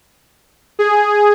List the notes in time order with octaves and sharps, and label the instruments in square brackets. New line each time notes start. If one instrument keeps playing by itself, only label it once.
[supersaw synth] G#4